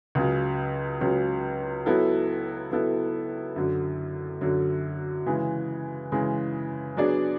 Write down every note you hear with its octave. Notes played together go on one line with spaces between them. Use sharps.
C#2 C#3 F#3
C#2 C#3 F#3
F#3 B3 E4 A4
F#3 B3 E4 A4
F#2 D3 F#3
F#2 D3 F#3
C#3 E3 G#3
C#3 E3 G#3
F#3 B3 D4 G#4 D5